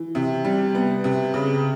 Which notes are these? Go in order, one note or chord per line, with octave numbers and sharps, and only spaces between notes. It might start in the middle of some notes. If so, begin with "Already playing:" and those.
Already playing: E3
C3
G3
B3
C3
C#3